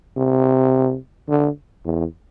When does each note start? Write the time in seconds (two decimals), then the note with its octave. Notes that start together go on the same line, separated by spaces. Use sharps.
0.17 C3
1.29 D3
1.85 E2